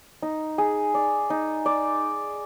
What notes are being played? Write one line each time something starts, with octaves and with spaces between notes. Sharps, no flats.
D#4
G#4
D5
D#4
D5